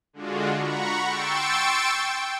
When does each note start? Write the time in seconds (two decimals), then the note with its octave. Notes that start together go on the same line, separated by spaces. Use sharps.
0.13 D3 G#3 D4 F4 F#4
0.57 F#5 A#5 B5 C#6
1.04 G5 C6 C#6 E6 A6 D7
1.96 G5